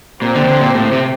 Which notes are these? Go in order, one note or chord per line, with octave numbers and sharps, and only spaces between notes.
A#2 C4 G4 C5
D3
D#3
D3
A#2
A2
C3